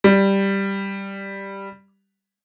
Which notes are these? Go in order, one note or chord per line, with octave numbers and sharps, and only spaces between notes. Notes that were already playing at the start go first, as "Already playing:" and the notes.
G3